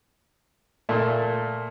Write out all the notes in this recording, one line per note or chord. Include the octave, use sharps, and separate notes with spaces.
A#2 A3